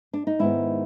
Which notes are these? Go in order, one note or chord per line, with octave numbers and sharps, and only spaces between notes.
D4
D#4
G#2 D#3 G#3 B3 E4